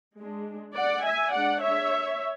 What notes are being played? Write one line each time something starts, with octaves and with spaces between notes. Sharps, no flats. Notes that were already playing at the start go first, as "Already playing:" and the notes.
G#3 D4
D5 F#5
E5 G#5
G#3 D4 D5 F#5
C#5 E5